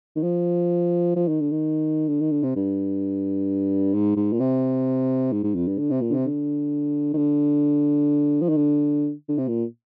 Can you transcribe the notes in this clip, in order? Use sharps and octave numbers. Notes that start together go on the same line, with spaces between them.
D#3
F3
F3
D#3
D3
D#3
D3
D#3
D3
C3
G2
G#2
G#2
A#2
C3
G#2
G#2
F2
G2
D3
C3
A#2
D3
C3
D3
D#3
D3
F3
D#3
D3
D3
C3
A#2